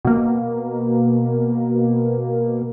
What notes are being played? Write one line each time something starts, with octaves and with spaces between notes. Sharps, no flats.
B2 A#3